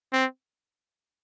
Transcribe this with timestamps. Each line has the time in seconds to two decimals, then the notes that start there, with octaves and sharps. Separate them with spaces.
0.13 C4